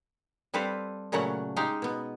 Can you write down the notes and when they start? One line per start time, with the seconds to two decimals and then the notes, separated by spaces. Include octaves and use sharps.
0.54 G3 C4 A4 B4 C5 F5
1.12 A#2 C#3 F#3 A3 C#4 F#5
1.56 G#3 D#4 G4 F5
1.82 B2 B3